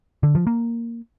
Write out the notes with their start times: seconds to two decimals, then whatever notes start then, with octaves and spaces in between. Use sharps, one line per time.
0.23 D3
0.35 F3
0.47 A#3